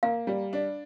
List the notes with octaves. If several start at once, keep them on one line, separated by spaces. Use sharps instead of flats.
A#3 F5
G3
D4